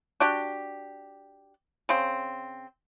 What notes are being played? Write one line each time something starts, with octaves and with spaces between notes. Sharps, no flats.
D4 F#4 G4
C#3 C4